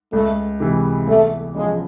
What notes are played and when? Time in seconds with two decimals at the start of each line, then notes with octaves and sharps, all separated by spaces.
0.13 C#2 A3
0.60 C3 E3 G#3
1.07 E2 A3
1.55 C#3 F3 G#3